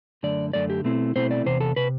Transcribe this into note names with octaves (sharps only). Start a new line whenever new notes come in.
F#2 D3 A3 D5
F#2 D3 A3 D5
G4
B2 A3 C4 E4
B2 A3 C4 E4 C5
D5
E2 C3 C5
A4
C3 B4